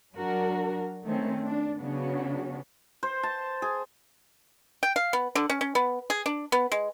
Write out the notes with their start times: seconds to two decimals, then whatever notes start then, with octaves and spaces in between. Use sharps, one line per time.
0.14 F#3 D4 F#4 A#4
1.05 D#3 A3 C4 C#4
1.45 D4
1.78 C#3 F#3 B3 C#4 D4 F#4
3.03 C5
3.23 A5
3.62 G#4
4.83 G5
4.96 F5
5.13 B3
5.35 D3
5.50 C#4
5.61 C#4
5.75 B3
6.10 G#4
6.26 D4
6.52 B3
6.72 G#3